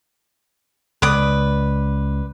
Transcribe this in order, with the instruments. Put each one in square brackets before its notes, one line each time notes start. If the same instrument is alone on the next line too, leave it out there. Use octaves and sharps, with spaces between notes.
[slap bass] C#2 [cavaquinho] B4 D5 D#6